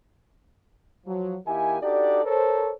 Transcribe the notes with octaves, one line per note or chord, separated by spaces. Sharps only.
F3 F#3
D#3 A#3 E4 G4 G#5
D4 D#4 F#4 G4 A4 D5
A4 A#4 C5 C#5